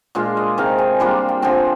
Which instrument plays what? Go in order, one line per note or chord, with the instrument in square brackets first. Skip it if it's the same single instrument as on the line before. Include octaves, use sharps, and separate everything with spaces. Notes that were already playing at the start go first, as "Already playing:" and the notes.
[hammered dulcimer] A#2 G#3 D4 F4 F5
D#5
C3 D#3 G#3 D#4 F5
G#5
G3 A#3 D4 F4 C6
G5
D3 F3 C4 F4 G#5